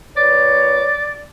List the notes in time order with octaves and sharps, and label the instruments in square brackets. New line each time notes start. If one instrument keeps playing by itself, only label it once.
[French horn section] A#2 B4 C#5 [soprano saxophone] D5